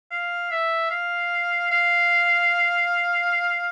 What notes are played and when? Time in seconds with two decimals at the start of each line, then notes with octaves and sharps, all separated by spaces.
0.11 F5
0.51 E5
0.90 F5
1.71 F5